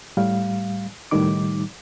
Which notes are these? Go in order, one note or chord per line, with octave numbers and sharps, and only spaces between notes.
A2 G3 F5
C#2 A2 D#3 G3 D#4 D6